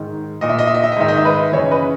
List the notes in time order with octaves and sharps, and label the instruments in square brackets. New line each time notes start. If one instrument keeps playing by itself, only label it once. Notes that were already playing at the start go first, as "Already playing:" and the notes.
Already playing: [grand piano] G#2 D#3
A#2 D#5
E5
D#5
E5
D#5
E5
D#5
G#2 D#3 E5
D#5
E5
B4 D#5
F#2 C#3 E3 C#5 E5
B4 D#5